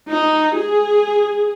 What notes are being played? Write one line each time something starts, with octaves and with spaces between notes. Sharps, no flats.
D#4
G#4